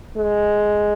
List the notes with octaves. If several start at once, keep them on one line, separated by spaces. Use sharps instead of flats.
G#3